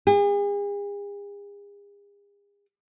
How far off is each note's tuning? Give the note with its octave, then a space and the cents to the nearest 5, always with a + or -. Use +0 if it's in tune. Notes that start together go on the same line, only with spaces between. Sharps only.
G#4 -45